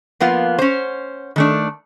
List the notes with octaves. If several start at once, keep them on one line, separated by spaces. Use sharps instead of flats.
F3 A#3 B3 F4
C#4 C5
D#3 A3 D4